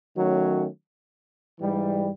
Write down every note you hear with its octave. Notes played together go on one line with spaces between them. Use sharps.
D#3 F#3 A3 C#4 F#4
G#2 E3 G3